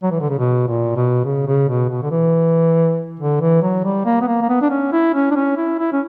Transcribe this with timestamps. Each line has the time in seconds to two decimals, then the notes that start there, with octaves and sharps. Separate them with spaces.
0.03 F#3
0.11 E3
0.21 D3
0.30 C#3
0.39 B2
0.68 A#2
0.96 B2
1.24 C#3
1.47 C#3
1.69 B2
1.90 B2
2.02 D3
2.11 E3
3.19 D3
3.41 E3
3.62 F#3
3.85 G3
4.06 A#3
4.22 B3
4.28 A#3
4.42 A#3
4.49 B3
4.62 D4
4.70 C#4
4.92 E4
5.15 C#4
5.31 D4
5.36 C#4
5.57 E4
5.79 E4
5.92 C#4